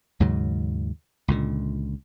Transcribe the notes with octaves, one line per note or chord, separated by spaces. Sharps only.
D#2 G#2 C#3 F#3
C#2 A#2 D3